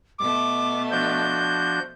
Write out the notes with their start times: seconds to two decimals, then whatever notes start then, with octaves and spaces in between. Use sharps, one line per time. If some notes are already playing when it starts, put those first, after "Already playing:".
0.19 B2 A3 D6
0.91 F3 D4 F#4 G6